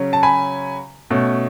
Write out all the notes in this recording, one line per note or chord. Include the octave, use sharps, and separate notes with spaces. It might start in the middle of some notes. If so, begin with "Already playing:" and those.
Already playing: C#3 F#3 C#4
A5
G#5 B5
B2 A3 C#4